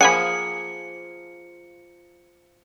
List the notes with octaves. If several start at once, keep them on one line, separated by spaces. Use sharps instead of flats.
F3 A#3 G#4 F#5 G#5 B5 C#7